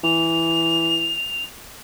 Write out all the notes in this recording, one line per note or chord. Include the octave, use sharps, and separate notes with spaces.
E3 F7